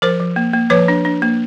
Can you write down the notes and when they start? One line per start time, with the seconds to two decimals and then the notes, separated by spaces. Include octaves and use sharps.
0.02 F3 A#4 C5
0.20 F3
0.36 A#3
0.53 A#3
0.70 F3 B4 C#5
0.88 D4
1.05 D4
1.22 A#3